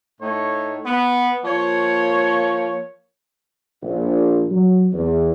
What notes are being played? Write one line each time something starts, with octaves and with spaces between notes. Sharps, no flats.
A2 A3 D#4 C#5
B3
F3 A#3 C#5
A#1
F#3
E2